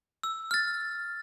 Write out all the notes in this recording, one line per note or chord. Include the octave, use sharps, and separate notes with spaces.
E6
F6 A6